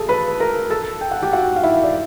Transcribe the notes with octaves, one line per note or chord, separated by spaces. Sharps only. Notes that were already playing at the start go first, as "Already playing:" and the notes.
Already playing: G#4 A4 A5
B4 B5
A#4 A#5
A4 A5
G5
F#5
G4 G5
F#4 F#5
F5
E4 E5
D5